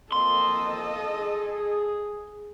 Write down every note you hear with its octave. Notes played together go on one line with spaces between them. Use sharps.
F2 A#3 C4 A4 D#5 C6
G#4